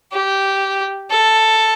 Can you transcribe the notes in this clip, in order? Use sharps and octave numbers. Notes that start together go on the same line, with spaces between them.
G4
A4